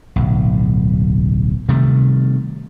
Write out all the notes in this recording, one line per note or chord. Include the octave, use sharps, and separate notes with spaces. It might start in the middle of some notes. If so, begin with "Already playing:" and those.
D1 B1
C3 D#3 G3 A3